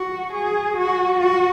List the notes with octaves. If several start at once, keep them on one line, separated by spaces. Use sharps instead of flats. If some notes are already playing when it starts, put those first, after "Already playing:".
Already playing: F#4
G#4
F#4
F#4